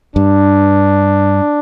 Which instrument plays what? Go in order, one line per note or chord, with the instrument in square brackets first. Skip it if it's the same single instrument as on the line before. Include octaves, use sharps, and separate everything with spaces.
[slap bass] G2 [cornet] D4